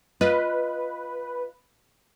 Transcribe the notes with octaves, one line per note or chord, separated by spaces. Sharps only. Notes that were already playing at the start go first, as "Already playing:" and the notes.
F4 B4 D#5